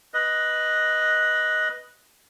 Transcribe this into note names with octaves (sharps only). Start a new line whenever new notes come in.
B4 D#5